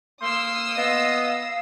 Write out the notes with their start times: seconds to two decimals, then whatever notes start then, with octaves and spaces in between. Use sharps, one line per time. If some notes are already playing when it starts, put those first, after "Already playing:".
0.22 A#3 C6 D#6 E6
0.78 B3 D#5 F5